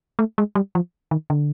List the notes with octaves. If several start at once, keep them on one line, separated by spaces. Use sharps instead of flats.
A3
G#3
G3
F3
D#3
D3